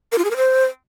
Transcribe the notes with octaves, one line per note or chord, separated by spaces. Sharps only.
A#4
F4
G#4
A#4
C5